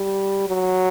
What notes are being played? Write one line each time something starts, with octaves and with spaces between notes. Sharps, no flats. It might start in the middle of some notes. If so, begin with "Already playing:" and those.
Already playing: G3
F#3